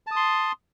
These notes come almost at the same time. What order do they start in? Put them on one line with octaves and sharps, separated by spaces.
A5 D#6 C6